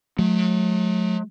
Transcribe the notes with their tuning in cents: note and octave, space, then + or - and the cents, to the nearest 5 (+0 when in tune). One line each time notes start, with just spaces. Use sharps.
F#3 -35 A3 -40